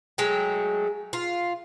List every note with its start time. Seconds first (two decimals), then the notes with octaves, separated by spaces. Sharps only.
0.18 F#3 G#3 A3 G5
1.13 F4